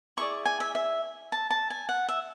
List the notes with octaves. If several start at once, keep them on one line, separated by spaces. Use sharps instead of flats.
E4 G#4 D5 C#6
G#5
E5
E5
A5
A5
G#5
F#5
E5